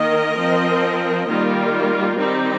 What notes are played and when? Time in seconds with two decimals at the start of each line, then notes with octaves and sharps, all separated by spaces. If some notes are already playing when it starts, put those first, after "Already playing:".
Already playing: D#3 A#3 A#4 D#5
0.38 F3 C4
1.29 D#3 G3 A#3 F4 A#4
2.19 D#3 G3 C4 D#4 G4